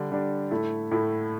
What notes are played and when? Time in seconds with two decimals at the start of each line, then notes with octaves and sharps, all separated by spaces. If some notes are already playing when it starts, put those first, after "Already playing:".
Already playing: D3 G3 D4
0.11 D3 G3 D4
0.51 A2 A3 E4
0.91 A2 A3 E4